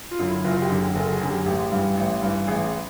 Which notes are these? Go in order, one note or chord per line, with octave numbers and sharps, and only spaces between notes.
F4
F#2 D3
E4
F#1 F4
G4
F#2 D3
G#4
F#1 A4
G#4
F#2 D3
G4
A1 G4
G2 E3
A1
G2 E3
A1 G#4